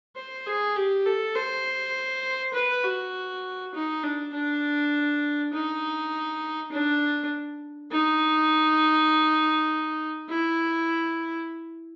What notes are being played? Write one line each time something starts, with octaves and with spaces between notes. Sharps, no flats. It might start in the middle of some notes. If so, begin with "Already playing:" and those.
C5
G#4
G4
A4
C5
B4
F#4
D#4
D4
D4
D#4
D4
D#4
E4